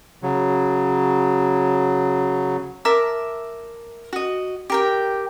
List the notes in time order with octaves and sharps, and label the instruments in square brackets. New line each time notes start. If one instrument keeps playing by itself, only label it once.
[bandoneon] C#3 F#3
[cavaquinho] A#4 E5 A5 D6
F#4 D#5
G4 A#4 G5